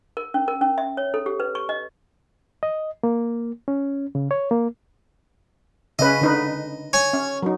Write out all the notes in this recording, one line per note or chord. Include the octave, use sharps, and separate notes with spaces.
A#4
C#4
A#4
C#4
E5
C#5
A4
G4
B4
C#6
D#5
D#5
A#3
C#4
C#3
C#5
A#3
C#3 C#4 B4 D#5
D3 D#4 B4
C#5 G#5
C#4
F#3 D#4